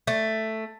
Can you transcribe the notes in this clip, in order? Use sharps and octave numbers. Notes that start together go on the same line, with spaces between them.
A3